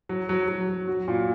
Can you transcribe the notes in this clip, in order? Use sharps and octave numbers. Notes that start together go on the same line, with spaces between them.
F#3
F#3
F#3
F#3
F#4
A#2